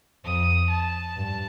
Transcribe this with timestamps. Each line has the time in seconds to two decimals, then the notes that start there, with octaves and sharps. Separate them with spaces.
0.24 F2 D#6
0.70 A5
1.16 G2